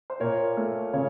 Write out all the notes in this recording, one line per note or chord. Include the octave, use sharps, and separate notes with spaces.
C5
A#2 A#4 C#5
A3
C#3 C#5